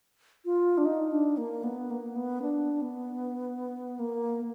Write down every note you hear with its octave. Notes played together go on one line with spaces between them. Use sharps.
F4
D4
D#4
D4
A#3
B3
A#3
B3
D4
B3
A#3